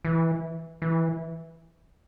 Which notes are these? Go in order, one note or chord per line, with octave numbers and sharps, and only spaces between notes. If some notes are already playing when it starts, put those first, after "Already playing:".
E3
E3